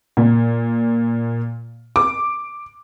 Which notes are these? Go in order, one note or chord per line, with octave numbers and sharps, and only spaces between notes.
A#2
D6